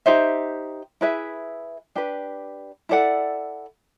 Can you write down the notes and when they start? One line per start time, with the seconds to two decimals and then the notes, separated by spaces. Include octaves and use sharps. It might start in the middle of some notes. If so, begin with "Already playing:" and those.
0.06 D#4 G4 C5 E5
1.01 E4 G#4 B4 E5
1.95 D4 G4 B4
2.89 E4 A4 D5 F#5